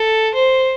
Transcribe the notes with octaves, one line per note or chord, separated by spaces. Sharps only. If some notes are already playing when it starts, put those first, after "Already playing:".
Already playing: A4
C5